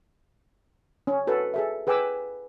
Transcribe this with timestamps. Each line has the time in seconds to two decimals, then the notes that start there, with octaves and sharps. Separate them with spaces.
1.07 C#4
1.27 F#4 A4 B4
1.54 G#4 A4 E5
1.87 G#4 B4 G5 G#5 D6 E6